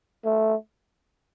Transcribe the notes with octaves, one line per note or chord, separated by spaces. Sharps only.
A3